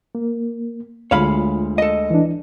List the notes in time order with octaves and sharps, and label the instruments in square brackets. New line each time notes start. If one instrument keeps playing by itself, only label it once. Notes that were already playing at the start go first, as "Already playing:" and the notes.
[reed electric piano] A#3
[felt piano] D2 G#3 [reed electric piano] F4 [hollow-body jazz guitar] C#5 F5 B5
[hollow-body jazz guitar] A4 D#5
[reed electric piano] E3 D4